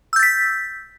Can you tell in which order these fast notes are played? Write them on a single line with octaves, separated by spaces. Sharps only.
E6 G6 A6 B6